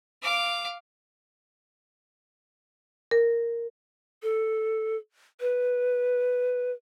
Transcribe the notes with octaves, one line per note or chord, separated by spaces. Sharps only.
F5 D6
A#4
A4
B4